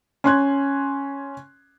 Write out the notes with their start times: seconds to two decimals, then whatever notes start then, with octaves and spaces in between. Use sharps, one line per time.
0.24 C#4 C6 F#6 G#6